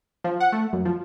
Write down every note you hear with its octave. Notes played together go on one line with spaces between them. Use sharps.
F3
F#5
A3
F#2
F3